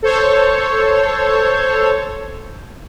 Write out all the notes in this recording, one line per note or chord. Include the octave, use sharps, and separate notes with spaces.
A4 C5 C#5